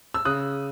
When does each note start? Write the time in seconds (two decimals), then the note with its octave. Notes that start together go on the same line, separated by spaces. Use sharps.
0.14 E6
0.25 C#3 D#6 F#6